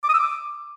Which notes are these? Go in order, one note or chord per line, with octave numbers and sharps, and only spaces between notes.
D6
D#6
E6
D6